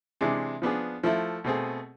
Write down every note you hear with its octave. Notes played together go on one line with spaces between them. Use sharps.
C3 E3 G#3 D4
F3 B3 D4 G#4
F3 A3 E4
B2 A3 C4 G#4